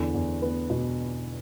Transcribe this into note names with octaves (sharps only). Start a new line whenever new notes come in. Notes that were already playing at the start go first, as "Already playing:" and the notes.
Already playing: E2 D3
E2
B3
B2